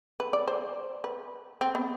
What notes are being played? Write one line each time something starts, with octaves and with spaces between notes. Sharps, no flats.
B4
D5
C5
B4
C4
B3